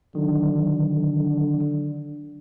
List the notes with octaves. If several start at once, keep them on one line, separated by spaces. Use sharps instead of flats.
D3 D#3 F#3